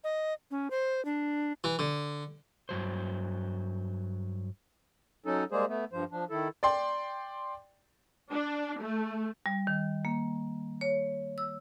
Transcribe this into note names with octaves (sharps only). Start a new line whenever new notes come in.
D#5
C#4
C5
D4
E3
D3
G2 F#3 C5
F#3 C#4 D#4 A4
G3 G#3 A#3 G#4 C5
A3 B3
G2 F3 C5
F3 D4
D#3 E4 A4
D5 G5 C6
D4
A3
G3
D#3
A#3
C#5
E6